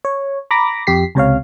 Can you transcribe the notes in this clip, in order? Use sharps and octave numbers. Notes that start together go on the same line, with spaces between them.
C#5
A#5 B5 D6 A#6
F2 G4 B6 C7
C#2 C3 C#5 F5